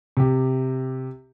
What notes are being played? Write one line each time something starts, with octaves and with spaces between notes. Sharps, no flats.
C3 G4